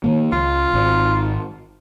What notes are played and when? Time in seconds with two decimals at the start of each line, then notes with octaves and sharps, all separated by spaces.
0.04 D#3 F3 A#3
0.32 C#2 F4
0.73 G#1